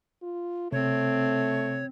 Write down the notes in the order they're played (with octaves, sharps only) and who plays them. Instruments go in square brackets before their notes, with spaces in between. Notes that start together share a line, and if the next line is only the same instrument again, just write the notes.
[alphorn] F4
[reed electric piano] C3 [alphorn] A3 [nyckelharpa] C4 [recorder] C#5